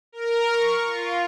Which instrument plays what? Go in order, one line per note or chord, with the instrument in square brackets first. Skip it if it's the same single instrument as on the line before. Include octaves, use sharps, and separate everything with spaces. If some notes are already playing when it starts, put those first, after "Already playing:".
[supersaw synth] A#4
C#6
F4